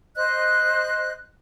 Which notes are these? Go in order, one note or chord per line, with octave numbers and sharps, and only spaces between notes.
C5 D#5 F#6